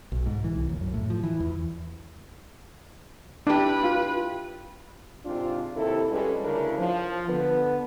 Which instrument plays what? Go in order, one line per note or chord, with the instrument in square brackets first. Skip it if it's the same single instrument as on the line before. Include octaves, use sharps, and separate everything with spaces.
[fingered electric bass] B1
G#2
E3
C2
D#2
F#2
A2
F3
E3
E2
[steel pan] D4 [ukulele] E4 G4 [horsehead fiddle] B4
[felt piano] F4
[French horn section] G#2 C3 C4 D4 F4
D#2 C3 E4 A4
G3 G#3 C#4 F4 A4 B4
D2 C#3 D4 E4 A#4
F3
D3 B3 B4